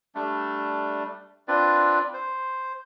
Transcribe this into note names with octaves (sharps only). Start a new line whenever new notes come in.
G3 A3 D4
C4 D4 F4 B4 D5
C5